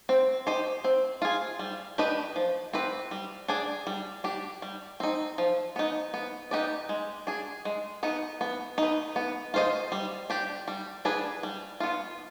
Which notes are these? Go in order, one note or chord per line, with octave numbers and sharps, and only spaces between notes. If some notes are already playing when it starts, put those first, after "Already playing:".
C4
G4 C5 D#5
C4
F4 G#4
G3
D4 G4 B4 D#5
F3
C4 G4 B4
G3
D4 G#4 D5
G3
D4 G4
G3
C4 D#4
F3
B3 D#4
B3
D#4 G4 B4 D5
G#3
D4 G#4
G#3
B3 D#4
B3
D#4 B4
B3
F4 C5 D#5
G3
D4 G4 D5
G3
D4 G#4 B4 D5
G3
B3 F4